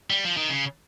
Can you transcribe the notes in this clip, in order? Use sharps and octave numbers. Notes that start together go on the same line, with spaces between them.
G3
F3
D#3
C#3